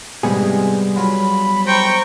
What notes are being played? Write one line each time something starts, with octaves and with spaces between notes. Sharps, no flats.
G#2 C3 G3 G#3 B3 G#4
F#3 F4 C#5 B5
C5 G5 A#5 C#6